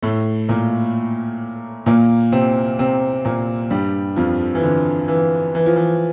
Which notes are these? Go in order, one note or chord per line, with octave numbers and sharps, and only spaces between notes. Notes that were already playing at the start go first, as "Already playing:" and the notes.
A2 A3
A#2 A#3
A#2 A#3
C3 C4
C3 C4
A#2 A#3
G2 G3
F2 F3
E3
D3
E3
E3
F3
E3